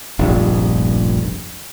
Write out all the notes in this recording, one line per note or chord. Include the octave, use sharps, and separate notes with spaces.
F1 A#1 G2